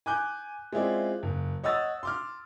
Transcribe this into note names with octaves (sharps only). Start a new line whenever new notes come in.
G#5 D6 F#6 G6
G#3 C4 C#4 E4 F4 D5
F#1
C#5 D#5 F#5 D#6 E6 A6
C6 D6 F6